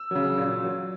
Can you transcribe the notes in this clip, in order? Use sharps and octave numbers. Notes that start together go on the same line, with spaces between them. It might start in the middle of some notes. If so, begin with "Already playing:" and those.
Already playing: E6
C#3 F#3
A#2
F#3